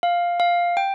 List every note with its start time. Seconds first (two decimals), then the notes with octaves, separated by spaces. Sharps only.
0.03 F5
0.40 F5
0.77 G5